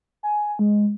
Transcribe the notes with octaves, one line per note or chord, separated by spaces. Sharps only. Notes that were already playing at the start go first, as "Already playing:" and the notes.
G#5
G#3